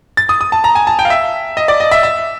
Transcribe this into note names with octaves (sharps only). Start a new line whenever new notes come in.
A6
D#6
D#6
A5
A#5
G#5
A5
G5
F5
E5
D#5
D5
D#5
E5
E5